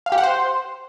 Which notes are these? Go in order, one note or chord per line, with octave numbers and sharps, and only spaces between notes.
F5
G4
F#5
C5